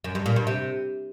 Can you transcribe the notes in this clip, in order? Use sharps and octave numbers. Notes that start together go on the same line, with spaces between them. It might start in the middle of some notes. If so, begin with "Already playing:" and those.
F#2
G2
A#2
G2
C3